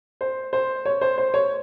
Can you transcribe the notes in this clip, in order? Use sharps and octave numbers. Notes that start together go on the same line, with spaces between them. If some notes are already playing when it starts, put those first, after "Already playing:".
C5
C5
C#5
C5
C5
C#5